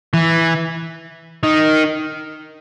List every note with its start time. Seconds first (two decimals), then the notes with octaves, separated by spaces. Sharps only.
0.14 E3
1.44 D#3